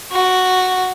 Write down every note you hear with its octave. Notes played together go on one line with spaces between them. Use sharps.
F#4